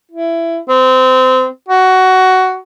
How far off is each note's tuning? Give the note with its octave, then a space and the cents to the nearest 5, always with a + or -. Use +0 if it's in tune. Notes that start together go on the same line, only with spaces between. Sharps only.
E4 +15
C4 -25
F#4 +15